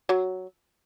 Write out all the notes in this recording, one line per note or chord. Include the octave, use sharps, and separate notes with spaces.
F#3